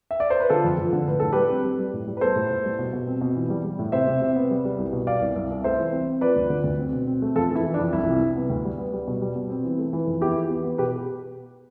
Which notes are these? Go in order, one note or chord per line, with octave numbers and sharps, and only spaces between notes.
E5
D5
C5
B4
D3 F4 A4
F2
F2
D3
A2 B4
A2 A4
G3 G4 B4
C4
G3
G3
A2
G3
B4
B3 A4 C5
A2
A2
G3
B2
B2
C4
B2
E3
G3
G3
A2
C3 C5 E5
C3
C3
B3
G3
G3
C2
B2
B3 D5 F5
C2
C2
C2
A3 C5 E5
E3
C4
C4
F3 B4 D5
D2
D3
D2
C4
B2
C4
A3
F2 F4 A4
E3
E4
E3
D4
F2
C2 E4
C3
C3
B3
D2
G3
B3
G3
B2
G3
B2
C4
E3
A3
E3
F2
B3 E4 G4
E3
B3
B3
B2 G4 B4